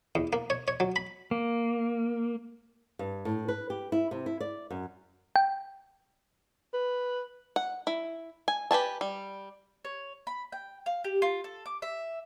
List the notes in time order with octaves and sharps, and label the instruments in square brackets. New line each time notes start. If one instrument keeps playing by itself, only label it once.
[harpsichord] E2
A#3
C#5
C#5
F#3
B5
[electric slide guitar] A#3
[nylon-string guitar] G2
A2
B4
G4
E4
C3
E4
D5
F#2
[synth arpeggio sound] G5
[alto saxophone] B4
[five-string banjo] F#5
E4
G#5
G4 B4 G#5 A5
G3
[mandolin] C#5
B5
G5
F5
G4
F4
A4
D6
E5